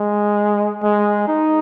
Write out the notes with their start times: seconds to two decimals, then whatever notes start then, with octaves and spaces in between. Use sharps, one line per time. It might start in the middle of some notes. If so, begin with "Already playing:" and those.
Already playing: G#3
0.83 G#3
1.27 D#4